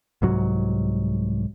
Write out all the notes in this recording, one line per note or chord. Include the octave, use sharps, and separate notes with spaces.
C2 G#2 F#3